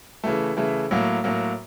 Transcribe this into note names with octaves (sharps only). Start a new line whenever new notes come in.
C#3 E3 A3
C#3 E3 A3
A2 F#3 A#3
A2 F#3 A#3